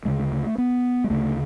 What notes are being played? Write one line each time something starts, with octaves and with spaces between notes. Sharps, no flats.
D2 C#3 G#3
A3
A3
B3
G#3
D2 C#3 A3